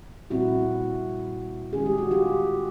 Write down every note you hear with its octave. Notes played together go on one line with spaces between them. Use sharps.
A#2 G3 C4 E4 F#4
D#3 G#3 C#4 G#4
G4
F#4
F4 G4